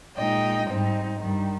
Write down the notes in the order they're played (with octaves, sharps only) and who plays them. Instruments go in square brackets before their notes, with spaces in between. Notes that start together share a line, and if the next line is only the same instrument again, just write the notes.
[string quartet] A#2 G#3 D#4 D#5 G5
G#2 G3 C4 D#4
G2 D#3 G3